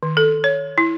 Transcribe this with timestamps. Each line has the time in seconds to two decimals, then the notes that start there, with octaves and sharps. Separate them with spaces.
0.03 D#3
0.17 A4
0.44 C#5
0.78 E4